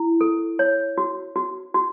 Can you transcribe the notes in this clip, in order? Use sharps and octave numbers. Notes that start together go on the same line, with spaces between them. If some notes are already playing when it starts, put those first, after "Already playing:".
Already playing: E4
A4
C#5
F#4
F#4
F#4